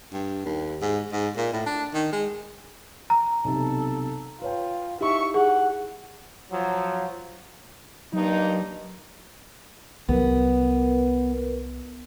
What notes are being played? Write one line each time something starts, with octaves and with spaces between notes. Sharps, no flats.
G2
D#2
G#2
G#2
A#2
A2
D4
D#3
G#3
A#5
B1 C3 A4
F4 B4 C#5 G5
D#4 E4 G4 E5 C#6
G#4 F#5
F3 F#3
G2 F#3 A#3 D#4
C2 F#3 B3 A#4 B4